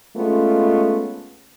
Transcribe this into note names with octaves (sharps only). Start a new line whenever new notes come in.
G#3 A3 B3 C#4 F4